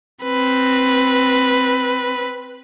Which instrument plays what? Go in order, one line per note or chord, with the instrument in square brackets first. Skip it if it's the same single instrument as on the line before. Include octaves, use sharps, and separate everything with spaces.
[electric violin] C4 B4